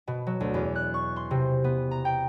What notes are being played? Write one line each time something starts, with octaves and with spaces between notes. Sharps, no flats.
B2
F#3
D2
E2
F#6
C#6
C6
C3
B3
A#5
G5